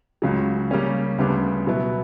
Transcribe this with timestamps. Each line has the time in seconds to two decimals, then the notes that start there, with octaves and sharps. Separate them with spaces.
0.22 C#2 C#3 F#3
0.71 C#3 G3 A#3 C#4
1.18 D2 C#3 G3 B3 D4
1.67 B2 F#3 B3 E4